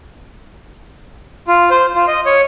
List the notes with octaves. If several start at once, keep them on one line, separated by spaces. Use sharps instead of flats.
F4
C5
F4
D#5
C#5